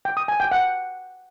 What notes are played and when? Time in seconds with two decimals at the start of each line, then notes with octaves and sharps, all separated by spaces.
0.05 G5
0.17 D#6
0.28 G#5
0.40 G5
0.52 F#5